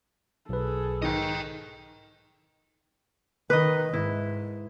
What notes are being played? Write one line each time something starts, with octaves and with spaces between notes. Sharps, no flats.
B1 G#4 A4 B4
G#2 D#3 D#5 G5
D#3 B4 D#5
G#2 E4